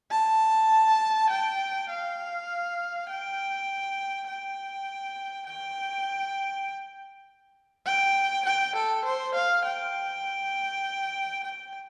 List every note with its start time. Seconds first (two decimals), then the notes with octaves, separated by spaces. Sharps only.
0.11 A5
1.30 G5
1.90 F5
3.10 G5
4.28 G5
5.47 G5
7.86 G5
8.45 G5
8.76 A4
9.05 C5
9.35 F5
9.65 G5
11.44 G5